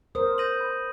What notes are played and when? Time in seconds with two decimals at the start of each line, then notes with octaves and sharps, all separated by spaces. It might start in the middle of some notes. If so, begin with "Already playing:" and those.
0.15 A#4 C5 D#6
0.38 G6 A#6 D#7 F#7
0.60 B5